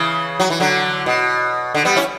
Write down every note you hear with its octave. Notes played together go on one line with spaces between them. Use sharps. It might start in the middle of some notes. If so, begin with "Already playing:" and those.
Already playing: C#3 E3
F#3
E3
D3 F#3
B2
D3
G3 B3
C#4 E4